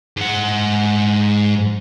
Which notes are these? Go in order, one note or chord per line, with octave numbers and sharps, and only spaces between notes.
G#2 F#5